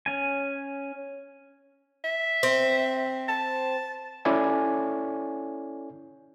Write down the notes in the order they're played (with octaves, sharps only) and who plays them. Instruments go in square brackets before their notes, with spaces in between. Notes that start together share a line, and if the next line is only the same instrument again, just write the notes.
[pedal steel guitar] C#4 G#5
[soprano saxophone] E5
[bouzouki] C4
[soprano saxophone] A5
[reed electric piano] C#4 E4 A4 C#5 D5 G#5